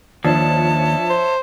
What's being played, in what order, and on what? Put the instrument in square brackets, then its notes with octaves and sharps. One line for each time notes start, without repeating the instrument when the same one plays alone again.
[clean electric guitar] D#2 [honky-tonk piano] F3 D4 [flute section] C#5 E5 A5
[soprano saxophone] C5